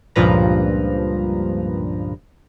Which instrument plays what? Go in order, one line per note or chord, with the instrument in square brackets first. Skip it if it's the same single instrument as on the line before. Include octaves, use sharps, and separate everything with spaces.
[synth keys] C#2 G2 A#2 F3 B4 A#5